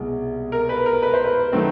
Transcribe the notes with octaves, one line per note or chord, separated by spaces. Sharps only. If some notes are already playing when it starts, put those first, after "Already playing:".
Already playing: C2 B2 G#3
A#4
B4
A#4
B4
C5
B4
D#3 F#3 A3 C4